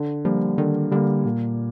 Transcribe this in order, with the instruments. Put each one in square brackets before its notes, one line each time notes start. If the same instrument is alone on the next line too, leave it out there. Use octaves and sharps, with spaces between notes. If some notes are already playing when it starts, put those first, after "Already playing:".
Already playing: [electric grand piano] D3
[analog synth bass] F3 [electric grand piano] G3 A#3
[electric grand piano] D3 [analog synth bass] D#3
[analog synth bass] D3 [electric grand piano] G3 A#3
[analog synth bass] A#2 [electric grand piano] A#3